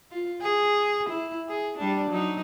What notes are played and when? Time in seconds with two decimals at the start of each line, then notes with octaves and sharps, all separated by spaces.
0.11 F4
0.41 G#4
1.09 E4
1.48 G#4
1.78 G3 D4
2.10 F#3 D#4